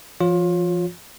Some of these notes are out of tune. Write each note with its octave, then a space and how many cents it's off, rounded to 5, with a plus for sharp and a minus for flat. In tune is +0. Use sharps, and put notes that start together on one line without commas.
F3 -30 F4 +25 C#5 +0